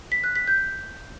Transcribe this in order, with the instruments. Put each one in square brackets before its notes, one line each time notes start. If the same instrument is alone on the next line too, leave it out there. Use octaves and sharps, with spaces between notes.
[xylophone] B6
F#6
B6
G6